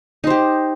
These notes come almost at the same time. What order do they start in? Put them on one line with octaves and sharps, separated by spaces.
D#4 C5 G4